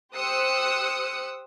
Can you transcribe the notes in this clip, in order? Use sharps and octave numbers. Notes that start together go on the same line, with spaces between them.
G4 C5 D#6 E6 F#6 C#7